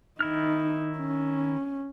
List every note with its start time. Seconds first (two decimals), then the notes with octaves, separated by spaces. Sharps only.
0.20 D#3 D#4 E4 F6
0.98 C#4